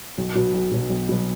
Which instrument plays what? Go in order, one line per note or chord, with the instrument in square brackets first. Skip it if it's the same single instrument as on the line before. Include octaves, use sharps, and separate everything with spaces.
[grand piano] B1
B2 F#3
B1
B2 F#3
B1
B2 F#3